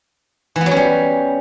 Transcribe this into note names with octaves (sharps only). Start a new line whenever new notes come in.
E3
B3
F#3
C#4
G3